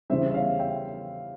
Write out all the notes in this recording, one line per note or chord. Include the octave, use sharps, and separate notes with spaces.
C#3 E3 G3 C5 E5
E5
C#5 F5
E5 G5